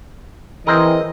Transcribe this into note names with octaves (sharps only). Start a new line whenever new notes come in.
E3 C4 G#4 A#4 D#5